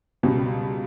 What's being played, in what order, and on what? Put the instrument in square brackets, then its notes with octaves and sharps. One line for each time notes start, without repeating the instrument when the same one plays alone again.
[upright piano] C#2 B2 G3